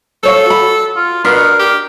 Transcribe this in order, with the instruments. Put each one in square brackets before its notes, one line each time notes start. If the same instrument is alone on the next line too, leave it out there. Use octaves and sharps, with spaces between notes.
[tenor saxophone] A4 [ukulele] C5 C#5 F5
[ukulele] F#4 B5
[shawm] F4
[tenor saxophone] B2 [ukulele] D4 [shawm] A#4
[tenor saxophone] G4